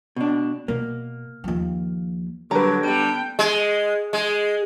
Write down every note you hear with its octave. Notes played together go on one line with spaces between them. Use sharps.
B2 D4
B2 A#3
D#2 F3
D3 F#3 G3 B4 A5 A#5
D3 G3 B3 G5 A5
G#3
G#3